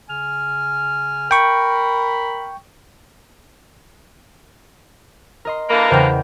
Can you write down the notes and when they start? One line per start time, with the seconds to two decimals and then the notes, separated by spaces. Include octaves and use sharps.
0.10 C#3 G#5 F6
1.31 A#4 G5 B5 C#6
5.45 A#4 D#5 C6
5.70 D3 E3 A#3 B5
5.91 E2 C#3 A#4 C5 G5